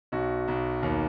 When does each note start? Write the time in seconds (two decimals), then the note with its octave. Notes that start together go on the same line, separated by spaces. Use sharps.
0.12 B1 F#4
0.48 B1
0.83 D#2